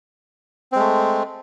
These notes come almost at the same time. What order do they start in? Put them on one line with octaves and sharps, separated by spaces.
C4 G#3 A3